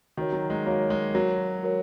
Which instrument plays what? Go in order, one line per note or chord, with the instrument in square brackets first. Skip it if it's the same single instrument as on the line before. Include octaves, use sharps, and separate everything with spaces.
[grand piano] D#3 [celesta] F#4 A#4 C#5
[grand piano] F#3
G#3
[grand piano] A#3 [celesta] F#4 A#4 C#5
[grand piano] G#3
[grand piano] F#3 [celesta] F#4 A#4 C#5
[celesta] F#4 A#4 C#5